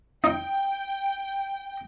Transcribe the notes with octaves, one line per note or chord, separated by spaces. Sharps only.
D#4 G5